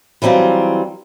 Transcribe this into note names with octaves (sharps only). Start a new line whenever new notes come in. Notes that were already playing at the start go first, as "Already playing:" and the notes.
E3 F#3 G3 C4 F4